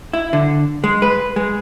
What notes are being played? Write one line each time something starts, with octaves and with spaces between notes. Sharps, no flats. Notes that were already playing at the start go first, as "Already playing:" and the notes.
E4
D3
G#3
B4
G#3